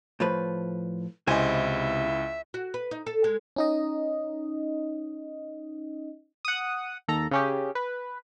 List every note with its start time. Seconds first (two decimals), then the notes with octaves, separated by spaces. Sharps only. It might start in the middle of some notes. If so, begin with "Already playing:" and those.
0.20 A2 F3 B4
1.27 C#2 C3 E4 C5 D#5 E5 G#5
2.54 F#4
2.74 B4
2.91 D#4
3.07 A4
3.24 G#3
3.56 C#4 D#4 D#5
6.45 F#5 D#6
7.08 D#2 A4 A#5
7.31 C#3 C#4 G4
7.75 B4